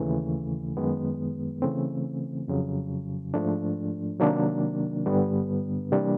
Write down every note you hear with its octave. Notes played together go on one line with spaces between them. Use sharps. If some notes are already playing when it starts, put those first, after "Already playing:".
Already playing: D#2 C#3 E3 A3
F#2 D#3 G#3 B3
C#3 E3 A3 C4
F2 C#3 F#3
G#2 F3 A3 D4
C3 D#3 F#3 A#3 D4
G2 D3 G3 B3
C3 E3 G3 A#3 D4